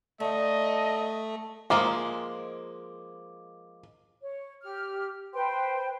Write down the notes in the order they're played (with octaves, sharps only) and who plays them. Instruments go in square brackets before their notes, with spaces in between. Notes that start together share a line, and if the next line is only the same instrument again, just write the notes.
[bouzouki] D3 D#4 [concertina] A3 [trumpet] D#5
[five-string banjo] F3 G#3 A#3 [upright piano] D6
[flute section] C#5
G4 F6
B4 C5 G5 C6